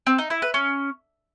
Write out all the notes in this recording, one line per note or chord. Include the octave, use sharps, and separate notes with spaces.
C4
D#4
E4
B4
C#4